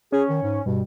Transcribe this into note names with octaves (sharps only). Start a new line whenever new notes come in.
C#4 G#4
D#3
G#2
G2 B2